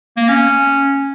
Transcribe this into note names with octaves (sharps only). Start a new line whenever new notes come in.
A#3
C#4